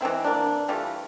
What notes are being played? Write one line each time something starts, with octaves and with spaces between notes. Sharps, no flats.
E3 G#3 C4 E4
A#3 D4
E3 G3 A3 F4